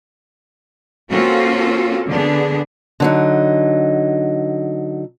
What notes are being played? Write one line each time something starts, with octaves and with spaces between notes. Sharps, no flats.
A#3 C4 C#4 F4 F#4 A4
D3 B3 D4 G#4
D3 F#3 D#4